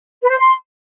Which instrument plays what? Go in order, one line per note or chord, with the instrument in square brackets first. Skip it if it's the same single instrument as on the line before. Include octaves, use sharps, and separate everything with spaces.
[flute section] B4
C5
C6